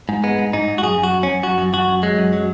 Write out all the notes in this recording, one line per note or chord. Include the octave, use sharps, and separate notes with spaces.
G#2
G#3 B3
G#2
G#2 D#4
G#2
F#4
F#2 G#4
F#2
F#4
F#2
C#4
F#2
F#2 F#4
F#2
F#2 F#4
F#2
F#3 G#3
F#2
F#3